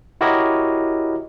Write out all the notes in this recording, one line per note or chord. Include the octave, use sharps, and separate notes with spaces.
E4 F#4 G4 A#4 C#5 D#5